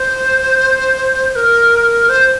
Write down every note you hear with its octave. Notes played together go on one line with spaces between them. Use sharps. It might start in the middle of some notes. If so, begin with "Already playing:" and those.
Already playing: C5
C5
A#4
C5